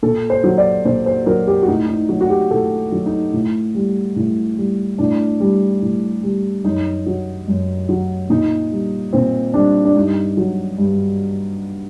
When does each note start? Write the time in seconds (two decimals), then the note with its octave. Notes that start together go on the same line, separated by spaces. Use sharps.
0.03 A#2 A4
0.30 C5
0.44 F#3
0.58 D5
0.85 A#2 C5
1.06 C5
1.26 F#3 A#4
1.47 G4
1.63 F#4
1.68 A2 D#4
1.88 D#4
2.09 F#3 F#4
2.21 F#4
2.30 G4
2.51 A2 A4
2.92 F#3
3.06 D#4
3.33 A2
3.75 G3
4.16 A2
4.57 G3
4.98 A2 D4
5.40 G3
5.82 A2
6.23 G3
6.65 F#2 D#4
7.06 F#3
7.48 F#2
7.89 F#3
8.30 A#2 D#4
8.71 G3
9.13 A#2 C4
9.54 G3 D4
9.85 D4
9.95 G2 D#4
10.37 F#3
10.78 G2